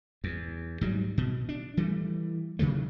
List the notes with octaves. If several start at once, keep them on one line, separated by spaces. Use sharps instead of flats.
E2
G#2 F#3 G3
B2
D4
E3 G3 A3
C3 D#3 F#3 A3